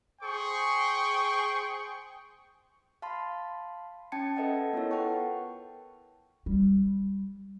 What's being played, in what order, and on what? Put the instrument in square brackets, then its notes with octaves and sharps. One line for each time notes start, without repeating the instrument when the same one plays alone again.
[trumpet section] G#4 C5 G5 C#6
[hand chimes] F5 A5 B5 C6
C#4 G5 A5 G#6 C#7
A4 B4 D#5 E5 F#5 A5
B3 E4 F4 A4 A#4 C#5
B4 F#5 G5 A5 C#6
[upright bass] G3